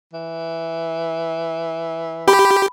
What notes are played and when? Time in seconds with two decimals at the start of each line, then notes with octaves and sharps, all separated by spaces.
0.14 E3
2.28 G4 B5